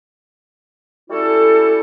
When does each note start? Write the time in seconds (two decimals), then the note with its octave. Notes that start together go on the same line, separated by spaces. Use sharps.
1.10 G3 A3 C#4 E4 F#4 A4